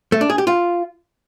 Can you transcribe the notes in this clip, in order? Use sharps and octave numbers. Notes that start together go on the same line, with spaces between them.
A3
D4
G#4
G4
F4